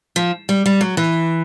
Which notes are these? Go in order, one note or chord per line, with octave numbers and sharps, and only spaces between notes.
F3
G3
G3
F#3
E3